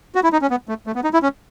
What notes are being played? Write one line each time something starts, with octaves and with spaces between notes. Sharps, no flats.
F#4
E4
D#4
C#4
B3
A3
A3
B3
D#4
E4
C#4